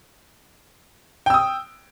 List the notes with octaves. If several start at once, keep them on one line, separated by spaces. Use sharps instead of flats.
G5 D#6 E6